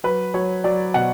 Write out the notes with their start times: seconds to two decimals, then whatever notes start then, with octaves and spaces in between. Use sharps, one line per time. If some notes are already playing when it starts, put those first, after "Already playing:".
0.04 F#3 B4
0.34 F#3 C#5
0.64 F#3 D5
0.94 B2 F#5